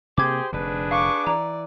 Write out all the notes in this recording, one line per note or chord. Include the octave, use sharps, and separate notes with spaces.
C3 A#3 G4 G#4 C5 D6 G#6
F1 D3 D4 G#4 B4
F5 C#6 D6
E3 D5 A#5